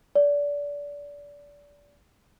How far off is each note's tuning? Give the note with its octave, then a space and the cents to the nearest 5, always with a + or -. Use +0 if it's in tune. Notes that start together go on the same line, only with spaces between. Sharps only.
D5 -25